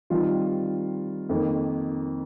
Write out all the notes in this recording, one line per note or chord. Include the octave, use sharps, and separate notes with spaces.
D#3 G3 C4 F4
F2 D#3 A#3